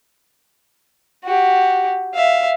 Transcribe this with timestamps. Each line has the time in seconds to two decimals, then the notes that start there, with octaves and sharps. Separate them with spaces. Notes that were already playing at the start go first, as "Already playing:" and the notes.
1.24 F#4 G4
2.14 E5 F5